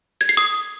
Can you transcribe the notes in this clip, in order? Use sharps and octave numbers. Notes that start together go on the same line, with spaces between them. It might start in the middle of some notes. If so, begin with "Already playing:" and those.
G#6
C7
D#6